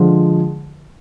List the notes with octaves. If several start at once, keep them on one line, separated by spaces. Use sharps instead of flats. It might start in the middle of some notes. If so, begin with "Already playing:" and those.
Already playing: D3 F3 G#3